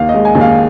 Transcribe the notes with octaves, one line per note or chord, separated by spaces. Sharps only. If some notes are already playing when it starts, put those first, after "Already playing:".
Already playing: D#2 F5
D#5
G#3
G#5
D#2
F5